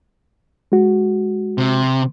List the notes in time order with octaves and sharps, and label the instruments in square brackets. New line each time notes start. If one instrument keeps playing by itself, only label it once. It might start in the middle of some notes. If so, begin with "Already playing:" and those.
[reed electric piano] G#3 F#4
[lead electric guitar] C3